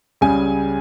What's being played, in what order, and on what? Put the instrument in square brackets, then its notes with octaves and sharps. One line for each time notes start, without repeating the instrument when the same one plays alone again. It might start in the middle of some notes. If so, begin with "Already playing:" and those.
[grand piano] C#2 C#3 G3 G#5